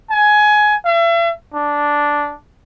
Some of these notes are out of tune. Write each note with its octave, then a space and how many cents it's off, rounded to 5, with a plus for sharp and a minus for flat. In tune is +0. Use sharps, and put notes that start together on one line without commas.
G#5 +15
E5 +40
D4 -5